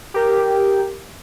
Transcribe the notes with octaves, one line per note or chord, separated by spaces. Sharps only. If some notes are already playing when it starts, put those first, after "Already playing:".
G4 A#4